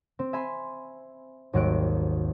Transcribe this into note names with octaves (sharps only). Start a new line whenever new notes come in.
C4
E5 G#5 B5 C6
G#1 D#2 F#3 G3 F#6 D7